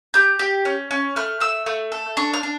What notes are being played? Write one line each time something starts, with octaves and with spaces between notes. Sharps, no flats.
G4 G6
G4
C#4
C#4
A3 F6
A3 E6
A3
A4
D4 C#6
F6
D4